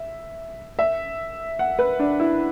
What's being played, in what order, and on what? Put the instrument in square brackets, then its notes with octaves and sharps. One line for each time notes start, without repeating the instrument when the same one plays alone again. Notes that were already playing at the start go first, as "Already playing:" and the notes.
Already playing: [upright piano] E5
E5
F#5
B4
D4
E4